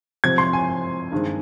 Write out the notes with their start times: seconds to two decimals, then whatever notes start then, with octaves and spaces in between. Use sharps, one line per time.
0.24 C3 F3 C4 G#6
0.38 C6
0.53 G#5
1.12 G2 D#3 G#3 C4